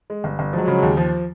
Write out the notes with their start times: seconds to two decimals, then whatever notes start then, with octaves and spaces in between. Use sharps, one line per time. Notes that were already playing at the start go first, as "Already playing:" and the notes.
0.10 G#3
0.24 G1
0.39 G1
0.53 F3 F#3 G#3
0.68 C#3
0.83 D#2
0.97 F3